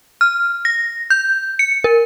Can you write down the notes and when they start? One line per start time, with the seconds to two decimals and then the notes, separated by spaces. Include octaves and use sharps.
0.21 F6
0.65 A#6
1.10 G6
1.59 C#7
1.84 A#4